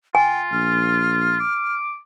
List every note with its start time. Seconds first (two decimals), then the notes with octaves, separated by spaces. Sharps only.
0.15 F4 G5 G#5
0.52 A#1 F6
1.40 D6